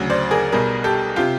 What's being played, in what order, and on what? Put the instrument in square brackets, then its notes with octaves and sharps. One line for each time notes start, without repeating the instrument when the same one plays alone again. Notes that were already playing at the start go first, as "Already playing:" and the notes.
Already playing: [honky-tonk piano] D2 C#3 F#3
C5 D5
G#4 A#4
B1 B2 G3 G#4 A#4
G4 A4
C3 F4 G4